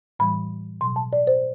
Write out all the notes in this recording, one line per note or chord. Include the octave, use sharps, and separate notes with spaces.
A2 E3 G3 B5
B2 F#3 C6
A5
D5
C5